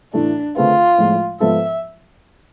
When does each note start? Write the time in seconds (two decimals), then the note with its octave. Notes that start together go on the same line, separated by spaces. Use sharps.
0.14 A2 E3 A3 D4 E4 A4
0.56 D3 A3 C4 F4 G#4 B4
0.98 A2 F3 G#3
1.40 G#2 F3 B3 F4 A4 E5